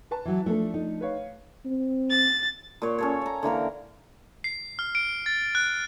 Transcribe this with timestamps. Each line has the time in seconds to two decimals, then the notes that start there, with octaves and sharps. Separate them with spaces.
0.11 B4 A5
0.25 E3 F#3
0.46 F3 A3 D4 A4
0.74 D#4
1.01 B4 C#5 F5
1.65 C4
2.11 A6
2.82 A#2 C#5
2.98 C#4 A4 C#5
3.21 C#5 A#5
3.43 D3 E3 A#3 A#4
4.44 C7
4.79 F6
4.95 D7
5.26 A6
5.55 F#6